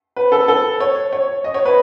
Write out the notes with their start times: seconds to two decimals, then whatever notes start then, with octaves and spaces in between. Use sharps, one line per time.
0.16 B4
0.32 A4
0.48 A4
0.80 C#5
1.13 C#5
1.44 D#5
1.54 C#5
1.65 B4